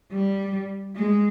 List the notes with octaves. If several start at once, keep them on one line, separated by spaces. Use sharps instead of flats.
G3
G#3